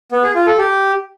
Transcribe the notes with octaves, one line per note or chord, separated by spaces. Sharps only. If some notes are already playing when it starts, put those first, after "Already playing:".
B3
G#4
F4
A4
G4